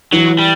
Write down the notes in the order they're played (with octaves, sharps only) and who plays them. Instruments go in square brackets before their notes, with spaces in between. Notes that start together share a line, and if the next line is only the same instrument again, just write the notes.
[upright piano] E3 [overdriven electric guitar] F#3
[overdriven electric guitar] G3